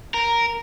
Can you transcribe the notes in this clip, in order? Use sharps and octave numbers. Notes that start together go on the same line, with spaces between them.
A#4